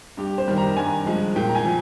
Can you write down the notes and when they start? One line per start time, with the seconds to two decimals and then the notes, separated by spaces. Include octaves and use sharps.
0.17 G2 G4
0.38 C5
0.48 D#3 G3
0.58 A#5
0.77 G2 G#5
1.06 F3 G#3
1.36 A#2 G5
1.49 A#5
1.55 G#5
1.65 F3